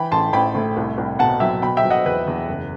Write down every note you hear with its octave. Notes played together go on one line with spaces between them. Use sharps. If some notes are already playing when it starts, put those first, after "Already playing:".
Already playing: E3 G5 B5
A1 A5 C6
A1 G5 B5
A2
C2
C2
B2 F#5 A5
F#3 E5 G5
B2 G5 B5
E5 G5
F#3
D#5 F#5
E2 B4
E2
F#1